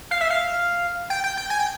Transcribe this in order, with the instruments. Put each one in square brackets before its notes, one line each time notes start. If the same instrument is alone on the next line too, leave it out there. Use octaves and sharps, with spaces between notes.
[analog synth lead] F5
E5
F5
G5
G5
G5
G#5
G5